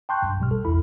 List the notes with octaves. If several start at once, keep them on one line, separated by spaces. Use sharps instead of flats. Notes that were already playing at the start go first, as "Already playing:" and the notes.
G5 A5 C6 C#6 F#6 G6
B1 G2
B1 B2 G3 F6
C2 A4
A1 E2 E4 B5